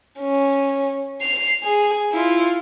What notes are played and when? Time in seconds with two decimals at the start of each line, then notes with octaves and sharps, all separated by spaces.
0.20 C#4
1.21 C7 F7
1.63 G#4
2.12 E4 F4